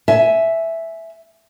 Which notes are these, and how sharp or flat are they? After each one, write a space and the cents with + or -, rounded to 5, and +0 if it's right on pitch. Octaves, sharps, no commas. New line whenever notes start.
E5 +0 G#5 +15